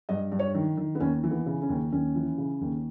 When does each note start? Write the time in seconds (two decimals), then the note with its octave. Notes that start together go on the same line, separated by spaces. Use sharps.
0.09 G2 D#5
0.32 G2
0.39 C#5
0.55 D#3
0.77 D#3
0.95 B3
1.00 D#2 C#4
1.24 E3
1.31 B3
1.46 C#3
1.62 C#4
1.69 D#2
1.92 D#2 C#4
2.15 E3
2.38 C#3
2.61 D#2